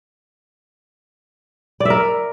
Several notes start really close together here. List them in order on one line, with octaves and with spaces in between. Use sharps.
D5 E5 A#4